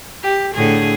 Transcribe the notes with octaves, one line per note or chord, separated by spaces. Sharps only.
G4
A2 D3 G#4